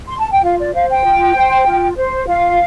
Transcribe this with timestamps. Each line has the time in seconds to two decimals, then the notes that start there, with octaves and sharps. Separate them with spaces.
0.07 C6
0.18 A5
0.31 G5
0.42 F4 F5
0.59 D5
0.73 C5 F5
0.89 G5
1.05 F4
1.35 C5
1.66 F4
1.96 C5
2.27 F4 F5